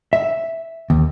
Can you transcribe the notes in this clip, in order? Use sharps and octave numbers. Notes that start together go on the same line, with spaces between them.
E5
D#2